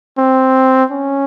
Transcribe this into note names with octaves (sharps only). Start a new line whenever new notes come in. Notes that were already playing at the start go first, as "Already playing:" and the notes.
C4
C#4